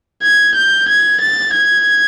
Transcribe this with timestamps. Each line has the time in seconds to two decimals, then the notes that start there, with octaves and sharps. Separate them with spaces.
0.22 G#6
0.55 G6
0.88 G#6
1.21 A6
1.53 G#6